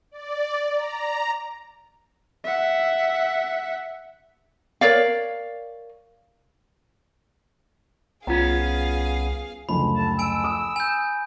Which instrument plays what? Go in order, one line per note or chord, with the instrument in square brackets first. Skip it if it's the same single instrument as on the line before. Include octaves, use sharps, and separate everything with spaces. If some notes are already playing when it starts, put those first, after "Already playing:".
[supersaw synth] D5
A#5
[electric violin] E5 F#5
[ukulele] A#4 C#5 D5 F5
[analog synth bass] C2 [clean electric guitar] B3 C#4 [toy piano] F4 A#5 [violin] G#4 F5
[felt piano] F#1 D2 F3 [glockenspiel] B5
[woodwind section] C2 D3 A5
[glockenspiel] G#5 D7 [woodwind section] E6
[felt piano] D#6
[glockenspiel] G#5 G6